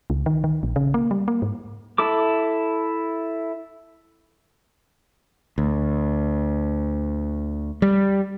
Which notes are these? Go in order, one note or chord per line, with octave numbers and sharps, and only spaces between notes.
C#2
D#3
D#3
A#1
C#3
A#3
G3
A#3
G#2
E4 A4 D6
D2
G3